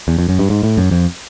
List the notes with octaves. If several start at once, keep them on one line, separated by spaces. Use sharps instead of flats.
E2
F2
F#2
G2
G#2
A2
F#2
F2